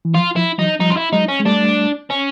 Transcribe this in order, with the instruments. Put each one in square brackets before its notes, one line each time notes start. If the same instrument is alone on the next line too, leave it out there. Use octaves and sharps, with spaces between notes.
[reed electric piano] E3
[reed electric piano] F3 [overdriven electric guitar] F4
[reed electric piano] F3 [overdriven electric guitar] E4
[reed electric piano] E3 F#3 [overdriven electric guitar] D#4
[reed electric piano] F3 G3 [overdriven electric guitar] D#4
[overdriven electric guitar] F4
E4
[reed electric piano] F#3 G#3 [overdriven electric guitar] D#4
[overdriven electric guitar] C#4
[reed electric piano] G#3
[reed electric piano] G3 A3 [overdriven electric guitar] D4
[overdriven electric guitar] C#4